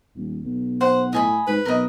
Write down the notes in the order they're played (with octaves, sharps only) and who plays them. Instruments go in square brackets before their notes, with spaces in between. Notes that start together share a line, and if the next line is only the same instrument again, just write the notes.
[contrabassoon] D#1
B1
[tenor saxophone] C5 [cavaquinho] F#5
[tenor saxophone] A2 [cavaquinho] D#5 G#5 B5
[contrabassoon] G#2 [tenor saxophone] B4
[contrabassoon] B1 [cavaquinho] A#4 D#5